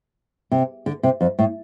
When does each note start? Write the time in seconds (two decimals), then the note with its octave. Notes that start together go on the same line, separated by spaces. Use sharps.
0.52 C3
0.86 D3
1.03 C3
1.21 F2
1.39 A2